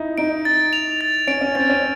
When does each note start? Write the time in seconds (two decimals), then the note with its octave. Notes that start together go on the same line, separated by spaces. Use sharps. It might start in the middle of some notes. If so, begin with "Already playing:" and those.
Already playing: D#4 E4
0.18 D#4 D7
0.45 A6
0.73 F7
1.01 A6
1.27 C#4 D7
1.41 C#4
1.55 C4 A6
1.70 C#4